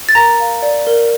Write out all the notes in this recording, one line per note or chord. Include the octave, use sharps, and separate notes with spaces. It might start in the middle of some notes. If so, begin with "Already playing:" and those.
A6
A#4 A#5 A#6
F5
D5
A#4